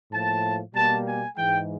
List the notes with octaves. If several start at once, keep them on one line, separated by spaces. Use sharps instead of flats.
A2 F3 A#3 A5
B2 G3 A#3 A5
G#5
G#2 E3 G#3 G5